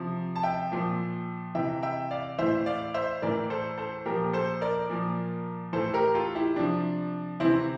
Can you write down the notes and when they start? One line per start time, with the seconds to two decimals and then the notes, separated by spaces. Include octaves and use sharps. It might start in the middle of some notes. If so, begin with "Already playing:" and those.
Already playing: C3 F3
0.36 A5
0.43 E5 G5
0.72 A#2 F3
1.55 C3 E3 E5 G5
1.83 E5 G5
2.11 D5 F5
2.38 A2 E3 C5 E5
2.66 D5 F5
2.94 C5 E5
3.22 A2 E3 A#4 D5
3.50 A4 C5
3.78 A4 C5
4.06 A#2 F3 G4 A#4
4.33 A4 C5
4.61 A#4 D5
4.89 A#2 F3
5.73 A2 E3 A4 C5
5.94 G4 A#4
6.14 F4 A4
6.35 E4 G4
6.56 C3 F3 D4
7.40 C3 E3 C4 E4